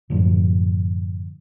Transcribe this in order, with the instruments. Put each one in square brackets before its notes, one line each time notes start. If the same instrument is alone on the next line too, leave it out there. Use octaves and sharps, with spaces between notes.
[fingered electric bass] F#2 A2 D3 F3